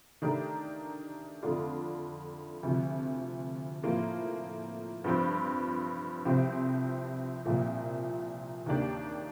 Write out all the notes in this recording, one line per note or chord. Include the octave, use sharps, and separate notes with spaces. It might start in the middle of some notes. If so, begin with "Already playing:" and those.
D#3 A3 D4 G4 A#4
F2 D3 A3 D4 F4
D2 C3 F3
A2 F3 A#3 F4
G2 F3 C4
C2 C3 F3 C4 G4
C2 A#2 F3 A#3
D#2 D#3 A#3 D4 G4